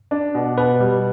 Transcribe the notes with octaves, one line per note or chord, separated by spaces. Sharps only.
D4
B2
B2 B4
G3